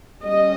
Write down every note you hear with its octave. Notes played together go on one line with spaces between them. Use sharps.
G3 C#4 D#5